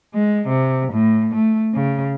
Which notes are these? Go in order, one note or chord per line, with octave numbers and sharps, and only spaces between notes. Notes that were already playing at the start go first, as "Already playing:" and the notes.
G#3
C3
A2
A3
C#3